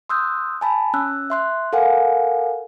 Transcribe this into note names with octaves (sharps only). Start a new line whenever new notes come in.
C6 D#6 E6 F#6 G6
G#5 A5 B5
C#4 E6 F#6
E5 C6 F#6
A4 A#4 F5 F#5 G#5